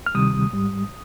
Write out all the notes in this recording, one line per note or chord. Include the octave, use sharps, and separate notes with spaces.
F6
D2 C3 D#3 G3 D#6
G#2 G3